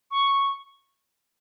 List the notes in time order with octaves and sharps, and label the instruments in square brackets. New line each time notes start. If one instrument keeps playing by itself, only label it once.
[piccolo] C#6